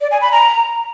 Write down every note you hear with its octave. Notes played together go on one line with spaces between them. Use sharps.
D5
G#5
B5
A#5